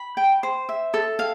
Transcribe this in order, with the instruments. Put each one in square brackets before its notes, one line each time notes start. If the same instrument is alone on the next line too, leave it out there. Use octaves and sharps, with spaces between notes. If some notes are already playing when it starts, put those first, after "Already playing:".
Already playing: [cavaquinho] B5
G5
C5
E5
A4
F5